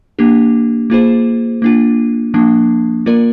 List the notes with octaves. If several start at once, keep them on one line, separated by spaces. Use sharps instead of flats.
A#3 D4 G4
A#3 F4 G#4 C5
A#3 D4 F4
F3 A#3 D4
A#3 F4 A#4 D5